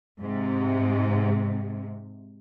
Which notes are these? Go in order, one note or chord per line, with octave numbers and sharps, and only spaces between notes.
G#2 C3